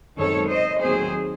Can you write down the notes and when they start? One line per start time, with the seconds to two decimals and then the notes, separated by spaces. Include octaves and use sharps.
0.18 F#2 D#3 G#3 C4 A4 C#5
0.50 C5 D#5
0.82 D#2 D#3 F#3 A3 C4 G#4 C5